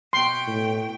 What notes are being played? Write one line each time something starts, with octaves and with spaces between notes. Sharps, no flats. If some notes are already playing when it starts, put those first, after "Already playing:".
B2 G5 C6
A2